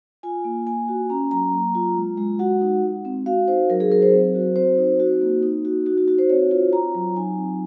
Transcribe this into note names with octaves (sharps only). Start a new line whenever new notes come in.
F4 G#5
A#3
A#3 G#5
F#4
C#4 A#5
F#3 A#5
A#3
F4
G#3
G#3
F#4 F#5
D#4
G#3
C4
F#4 F5
D#4 C5
F#3 A#4
G#4
F#3 A#4
C5
C4
F#4
C4 C5
D#4
F#4
A#3
D#4
F#4
D#4 F#4
F#4
F#4
C5
C4 C#5
F4
F4 A#5
F#3
D#4 G#5
C4